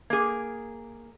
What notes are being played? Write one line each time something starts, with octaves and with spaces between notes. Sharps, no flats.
A#3 G#4